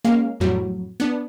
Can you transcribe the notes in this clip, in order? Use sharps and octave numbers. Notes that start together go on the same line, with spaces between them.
G#3 A#3 C#4 F5
F2 A2 F#3 G3
B3 D4